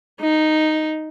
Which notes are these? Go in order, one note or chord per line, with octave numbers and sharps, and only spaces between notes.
D#4